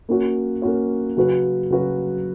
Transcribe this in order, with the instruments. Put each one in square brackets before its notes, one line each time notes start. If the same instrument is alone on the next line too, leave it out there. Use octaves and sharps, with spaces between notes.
[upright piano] A#3 C#4 F#4 C#5
A#3 C#4 F#4 C#5
C#3 F#3 C#4 F#4 B4
C#3 F#3 C#4 F#4 B4